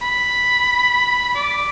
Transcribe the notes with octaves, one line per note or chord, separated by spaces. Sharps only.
B5
D5